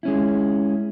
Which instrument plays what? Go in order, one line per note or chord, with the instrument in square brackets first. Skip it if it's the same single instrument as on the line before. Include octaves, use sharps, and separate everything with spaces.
[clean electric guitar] G#3 C#4 E4